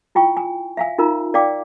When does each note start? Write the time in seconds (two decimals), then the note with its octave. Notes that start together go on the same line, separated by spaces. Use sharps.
0.15 E4 F4 G5 C#6
0.37 G#5
0.77 E5 F5 G#5
0.98 D#4 F4 A#4 A#5
1.34 A#4 D5 F5 G5 D6